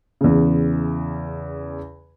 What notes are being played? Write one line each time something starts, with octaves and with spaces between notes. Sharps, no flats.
E2 C#3